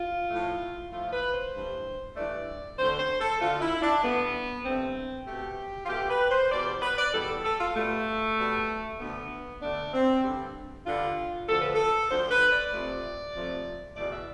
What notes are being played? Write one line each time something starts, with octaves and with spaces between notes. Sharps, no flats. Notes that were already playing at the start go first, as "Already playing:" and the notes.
Already playing: F4
A2 F3 A3
A2 F3 A3 F4
B4
C5
G2 E3 A3
G2 E3 A3 D5
D2 D3 A3 C5
C5
A4
D2 D3 A3 F4
E4
D4
G2 D3 A3 B3
G2 D3 A3 C4
B2 A3 G4
F4
B2 A3 G4
B4
C5
E2 B2 G3 D5
C5
B4
D5
E2 B2 G3 A4
A4
A4
F4
B2 G3 A3
B2 G3
D2 D3 A3 B3
D2 D3 A3 D4
C4
G2 D3 G3
G2 D3 G3 F4
D2 D3 F3 A4
B4
A4
D2 D3 F3 C5
B4
D5
F2 C3 F3 A3
F2 C3 F3 A3
E2 B2 A3 D5
E5